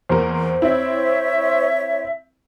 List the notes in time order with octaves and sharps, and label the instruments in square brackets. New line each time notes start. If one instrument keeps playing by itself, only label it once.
[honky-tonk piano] E2 A#3 A#4 [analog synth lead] C5
[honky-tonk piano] C4 E4 [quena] C#5 [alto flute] E5